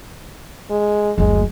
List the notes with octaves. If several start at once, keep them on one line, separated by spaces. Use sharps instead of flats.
G#3
F#1 D2 G#3